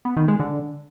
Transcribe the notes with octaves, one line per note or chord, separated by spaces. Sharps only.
B3
D#3
G#3
D3